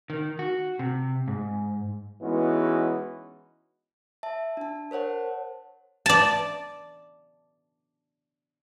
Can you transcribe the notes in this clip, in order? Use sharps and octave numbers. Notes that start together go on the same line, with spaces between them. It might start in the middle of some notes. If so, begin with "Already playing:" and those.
D#3
F#4
C3
G#2
E3 G#3 B3 C#4 D#4 F#4
E5 A5
D4 A5
A#4 C5 C#5 F#5 A5
D5 A5